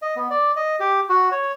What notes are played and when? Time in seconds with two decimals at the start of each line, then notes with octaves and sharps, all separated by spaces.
0.02 D#5
0.16 B3
0.30 D5
0.56 D#5
0.80 G4
1.09 F#4
1.31 C#5